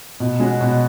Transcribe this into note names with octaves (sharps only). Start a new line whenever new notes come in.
B2
G#3 C#4 F#4
B2